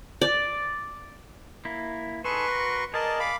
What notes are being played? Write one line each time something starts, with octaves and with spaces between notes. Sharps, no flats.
D5
A#3 E4
D#4 G#4 A4 B4 C6 C#6
F#4 A#4
G#4 A#4 D5 D#5 A5
F5 B5 D6